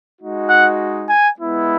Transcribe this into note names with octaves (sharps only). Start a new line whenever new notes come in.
G#3 D#4 F#4
F#5
G#5
G#3 B3 E4